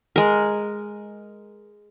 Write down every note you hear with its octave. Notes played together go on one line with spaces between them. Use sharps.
G#3 A#4